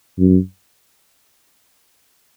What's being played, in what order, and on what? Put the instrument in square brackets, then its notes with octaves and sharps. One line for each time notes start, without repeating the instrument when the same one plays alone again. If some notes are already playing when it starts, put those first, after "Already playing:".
[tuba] F#2